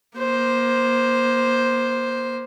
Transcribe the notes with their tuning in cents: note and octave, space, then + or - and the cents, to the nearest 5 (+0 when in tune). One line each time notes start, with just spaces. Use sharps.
A#3 +25 C5 +0